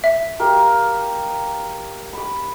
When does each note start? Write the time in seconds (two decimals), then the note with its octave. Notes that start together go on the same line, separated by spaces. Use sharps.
0.04 E5
0.39 G4 A#4 F5
2.13 B5 D6